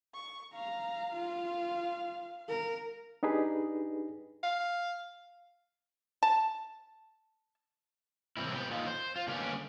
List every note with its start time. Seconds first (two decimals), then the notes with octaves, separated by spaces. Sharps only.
0.14 C#6
0.54 F5 A#5
1.13 F4
2.49 A#4
3.23 D4 D#4 G4 G#4 B4
4.43 F5
6.23 A5
8.37 A2 C3 E3 G3 C4 E4
8.54 B3 G4
8.71 A#2 D3 A#3 D#4 F4
8.87 C5
9.16 F4
9.28 D3 G3 A#3 B3 C#4 G4